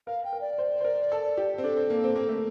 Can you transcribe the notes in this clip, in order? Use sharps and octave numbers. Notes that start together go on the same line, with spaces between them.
A#4 F5
G5
A#4
D5
C5
C5
A#4
A4
G4
C4
D4 A4
C4
A#3
C4
A#3
A3